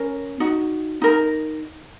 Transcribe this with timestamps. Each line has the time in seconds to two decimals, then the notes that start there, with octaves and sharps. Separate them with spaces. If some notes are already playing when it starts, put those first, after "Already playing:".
Already playing: C#4 A#4
0.40 D#4 F#4
1.02 D#4 A#4